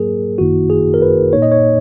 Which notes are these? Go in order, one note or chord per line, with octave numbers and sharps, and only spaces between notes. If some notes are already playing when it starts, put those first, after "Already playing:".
Already playing: G#2 F#3 A#3 G#4 A#4
G#1 F#2 D#3 A#3 E4 F#4
G#4
A#4
B4
A#2 A#3 D#4 C#5
D#5
C#5